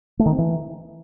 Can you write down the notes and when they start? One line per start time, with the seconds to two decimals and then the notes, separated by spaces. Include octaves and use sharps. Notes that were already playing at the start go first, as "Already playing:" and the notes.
0.19 A3
0.26 D#3
0.32 C4
0.38 E3